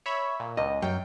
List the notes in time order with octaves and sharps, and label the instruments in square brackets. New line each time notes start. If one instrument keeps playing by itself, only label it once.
[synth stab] C#5 E5 B5
A#2
[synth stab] C#2 [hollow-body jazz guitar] D#5
[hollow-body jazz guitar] F#2 [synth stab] G5